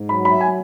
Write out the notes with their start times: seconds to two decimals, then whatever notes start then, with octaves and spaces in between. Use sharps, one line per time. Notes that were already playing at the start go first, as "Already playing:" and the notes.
Already playing: G#2
0.09 F#3 B5
0.25 B5
0.31 E5
0.41 G#5